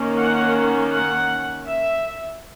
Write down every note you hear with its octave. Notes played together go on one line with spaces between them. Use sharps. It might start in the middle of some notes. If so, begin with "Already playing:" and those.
Already playing: D#3 A#3 C#4
F#5
F#5
E5